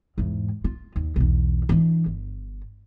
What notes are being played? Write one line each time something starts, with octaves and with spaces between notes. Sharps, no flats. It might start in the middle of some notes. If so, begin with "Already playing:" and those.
E2 G#2
F4
D#2
B1 E2
E3 D4
G1